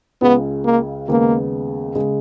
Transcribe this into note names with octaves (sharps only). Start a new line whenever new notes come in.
C#2 C#3 G#3 B3
A#3
D#2 C#3 G#3 A#3 B3
C#3 G#3